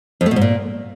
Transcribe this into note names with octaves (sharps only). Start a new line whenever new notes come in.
F2
A3
B2
G#2
A#2